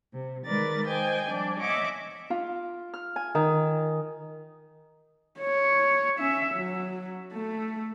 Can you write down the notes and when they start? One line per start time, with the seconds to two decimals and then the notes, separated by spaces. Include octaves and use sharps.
0.13 C3
0.45 D#3 G#3 A#4 B4 D5 A6
0.86 C5 D#5 G5 G#5
1.27 F3 G3 C4 D4 D5
1.60 C#5 D#5 E5 F#5 G#5 D6
2.30 F4
2.94 F6
3.16 G#5
3.35 D#3
5.39 C#5
6.19 C#4 E5
6.55 F#3
7.33 A3